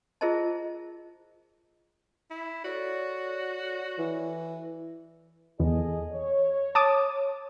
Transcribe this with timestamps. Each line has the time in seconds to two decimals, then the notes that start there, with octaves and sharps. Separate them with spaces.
0.21 F4 G#4 A#4 C5 D#5 A5
2.30 E4
2.64 F#4 A4 C#5 D5
3.98 E3
5.60 E2 G#4 A4 D#5
6.13 C#5
6.75 A5 D6 D#6